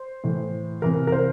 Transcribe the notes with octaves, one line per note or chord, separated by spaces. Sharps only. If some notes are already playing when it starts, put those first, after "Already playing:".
Already playing: C5
A2 E3
C3 E3 A#4
A#4
C5